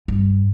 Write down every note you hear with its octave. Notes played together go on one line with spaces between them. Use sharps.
G2